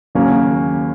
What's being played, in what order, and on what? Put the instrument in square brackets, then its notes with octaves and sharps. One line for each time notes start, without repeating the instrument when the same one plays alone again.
[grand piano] D#2 C#3 F#3 A#3 C#4